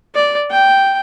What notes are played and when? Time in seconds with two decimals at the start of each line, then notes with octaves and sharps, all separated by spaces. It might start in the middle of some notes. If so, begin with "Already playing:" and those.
0.15 D5
0.51 G5